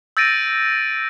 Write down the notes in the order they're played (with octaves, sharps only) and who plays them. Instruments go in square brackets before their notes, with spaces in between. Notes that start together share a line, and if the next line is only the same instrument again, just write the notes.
[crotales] E6 G6 A6 A#6 D7 D#7